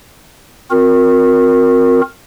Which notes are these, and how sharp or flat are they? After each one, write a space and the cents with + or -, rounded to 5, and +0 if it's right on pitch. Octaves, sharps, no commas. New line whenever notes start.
C4 +0 F#4 -45 A#4 +0